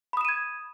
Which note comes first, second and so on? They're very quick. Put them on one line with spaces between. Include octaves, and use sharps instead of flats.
B5 D#6 E7 D#7 G#6